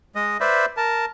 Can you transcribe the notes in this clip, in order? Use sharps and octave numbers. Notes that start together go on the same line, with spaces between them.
G#3 D#5
B4 C5 D5 E5
A#4 A5